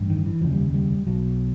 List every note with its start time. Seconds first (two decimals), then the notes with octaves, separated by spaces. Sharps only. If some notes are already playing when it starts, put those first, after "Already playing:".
Already playing: A1 G2
0.10 D#3
0.26 E3
0.41 F1 D#2 C#3 F3
0.53 G3
0.74 G3
1.07 B1 B2 F#3